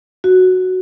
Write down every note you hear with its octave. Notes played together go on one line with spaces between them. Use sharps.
F#4